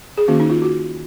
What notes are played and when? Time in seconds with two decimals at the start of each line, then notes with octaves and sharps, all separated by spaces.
0.18 G#4
0.28 D#3 A#3 C#4 F#4
0.40 D#4
0.50 F4
0.62 F#4